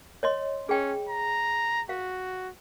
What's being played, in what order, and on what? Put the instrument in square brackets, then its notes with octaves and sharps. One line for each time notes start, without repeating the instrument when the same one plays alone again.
[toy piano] C#5 D#5 C6
[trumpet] C#4 [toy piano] G#4 G5
[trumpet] A#5
[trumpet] F#4 [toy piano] F5